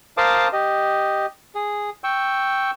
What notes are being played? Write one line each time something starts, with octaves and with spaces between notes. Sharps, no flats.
A#4 C5 F5 A5 D6 D#6
G4 D#5
G#4
G5 C#6 E6